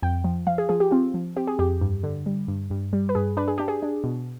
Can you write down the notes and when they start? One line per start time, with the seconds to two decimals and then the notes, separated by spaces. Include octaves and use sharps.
0.02 F2 G5
0.24 F3
0.47 F3 F5
0.58 G#4
0.69 F3 G#4
0.80 G4
0.91 C4 F4
1.14 F3
1.36 C4 G4
1.47 G#4
1.59 F2 G4
1.81 G2
2.03 D3
2.26 G3
2.48 G2
2.70 G2
2.93 G3
3.09 B4
3.15 G2 G#4
3.37 D4 B4
3.48 G#4
3.58 D4 G4
3.68 G#4
3.83 D4
4.04 B2